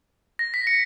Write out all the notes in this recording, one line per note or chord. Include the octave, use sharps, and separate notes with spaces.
A#6
B6
C#7